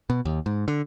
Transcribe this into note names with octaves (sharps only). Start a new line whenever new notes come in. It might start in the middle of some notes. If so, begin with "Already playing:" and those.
B2
D#2
G#2
D3